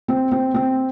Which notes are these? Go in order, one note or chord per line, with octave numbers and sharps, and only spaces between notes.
C4
C4
C4